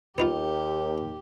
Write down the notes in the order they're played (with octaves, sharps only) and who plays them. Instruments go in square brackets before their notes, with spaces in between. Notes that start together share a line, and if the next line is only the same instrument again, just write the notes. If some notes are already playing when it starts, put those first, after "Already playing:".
[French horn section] D#2 [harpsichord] B3 D#4 F4 [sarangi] G4